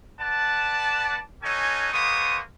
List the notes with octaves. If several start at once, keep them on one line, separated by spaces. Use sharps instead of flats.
B4 D5 F#5 A5
C#4 D#4 F#4 A4 C#5 G#5
G#3 A#3 B3 C5 C#6 D#6